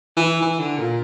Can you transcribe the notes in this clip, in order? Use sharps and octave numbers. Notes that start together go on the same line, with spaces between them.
E3
E3
D3
A#2